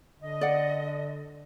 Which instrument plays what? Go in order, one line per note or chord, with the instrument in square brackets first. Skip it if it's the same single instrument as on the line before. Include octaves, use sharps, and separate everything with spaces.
[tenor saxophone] D3 [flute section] D#5
[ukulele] D5 F#5